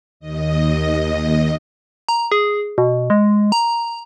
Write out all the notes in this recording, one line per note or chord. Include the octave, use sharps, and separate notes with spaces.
D#2 D#5
A#5
G#4
B2
G#3
A#5